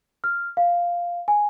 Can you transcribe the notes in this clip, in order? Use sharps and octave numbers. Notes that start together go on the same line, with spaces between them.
F6
F5
G#5